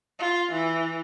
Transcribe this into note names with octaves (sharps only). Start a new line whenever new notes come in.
F4
E3